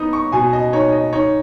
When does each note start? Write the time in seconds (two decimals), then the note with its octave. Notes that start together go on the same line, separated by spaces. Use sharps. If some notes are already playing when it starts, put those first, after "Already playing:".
Already playing: B3 D#4 D#6
0.13 C#6
0.32 B2 G#5
0.53 D#5
0.73 D#4 C#5
0.92 D#5
1.13 D#4 C#5